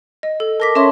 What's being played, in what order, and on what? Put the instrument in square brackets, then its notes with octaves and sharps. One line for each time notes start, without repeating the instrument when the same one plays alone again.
[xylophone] D#5
A4
[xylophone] A#4 A#6 B6 [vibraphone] A5 D6
[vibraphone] C#4 C6 [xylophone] C#5 E5 A5